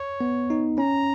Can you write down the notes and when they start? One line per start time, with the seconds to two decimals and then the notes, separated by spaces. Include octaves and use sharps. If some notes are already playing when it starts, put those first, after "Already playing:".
Already playing: C#5
0.21 B3
0.50 D#4
0.78 C#4 A#5